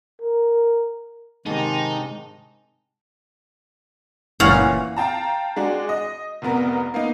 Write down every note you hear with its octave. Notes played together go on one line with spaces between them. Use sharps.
A#4
G#2 C3 D#3 D#4 A5
F#1 A#2 E3 C#4 F5 F#5
F5 G5 A5 A#5
G#3 D4 F#4
D#5
F1 C2 B3 A#4
A#3 B3 D#4